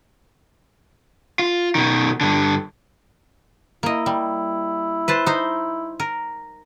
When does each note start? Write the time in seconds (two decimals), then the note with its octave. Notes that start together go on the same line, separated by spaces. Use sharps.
1.39 F4
1.75 B2 D#3
2.21 G2 D3
3.83 A#3 E4 D#5
4.06 G3
5.08 B4 C5 A5
5.26 D#4 C5
6.00 A#4